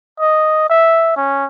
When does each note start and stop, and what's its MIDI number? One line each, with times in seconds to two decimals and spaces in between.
0.20 0.66 75
0.70 1.12 76
1.16 1.45 61